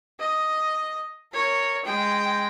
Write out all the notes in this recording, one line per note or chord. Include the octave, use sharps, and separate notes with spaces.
D#5
A#4 C#5
G#3 G5